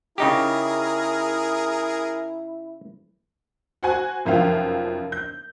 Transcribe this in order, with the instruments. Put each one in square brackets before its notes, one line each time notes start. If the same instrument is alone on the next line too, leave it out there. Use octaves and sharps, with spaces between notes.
[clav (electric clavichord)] C#3 D#4 G4 [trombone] E4 [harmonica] G#4 A#4
[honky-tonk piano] F#4 C5 F#5 G#5
F1 F#2 F3 E5 F5 G5
G6